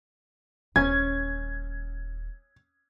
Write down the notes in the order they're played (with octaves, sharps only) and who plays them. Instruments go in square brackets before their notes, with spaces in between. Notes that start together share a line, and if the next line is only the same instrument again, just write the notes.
[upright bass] D#1 [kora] C#4 [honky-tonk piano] G#6